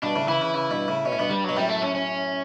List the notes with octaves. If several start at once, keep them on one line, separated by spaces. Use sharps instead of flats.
G2 B2 D4
A2 C#3
C#3 E3 E4
C#3 E3
C#3 E3
G2 B2
A2 C#3
B2 C#4
A2
G2 B2 B3
G2 G3
B2 F#3
F#2 A2 G3
A3
C#4
C#4